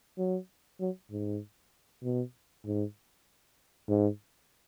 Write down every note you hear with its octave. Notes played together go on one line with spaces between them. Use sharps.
F#3
F#3
G#2
B2
G#2
G#2